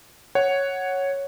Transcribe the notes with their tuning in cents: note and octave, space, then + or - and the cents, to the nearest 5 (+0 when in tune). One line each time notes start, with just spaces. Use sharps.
C#5 +0 F#5 +0